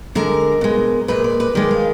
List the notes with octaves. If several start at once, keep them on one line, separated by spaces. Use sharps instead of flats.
D3 G#3 A#4
B2 G#3
A#2 G#3 B4
D5
B4
D#3 G#3 D5
F5